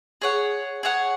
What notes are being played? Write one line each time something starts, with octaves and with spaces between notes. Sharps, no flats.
G#4 C#5 F#5
G#4 C#5 F#5